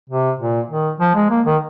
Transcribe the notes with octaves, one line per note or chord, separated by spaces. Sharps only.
C3
A#2
D#3
F3
G#3
A#3
D#3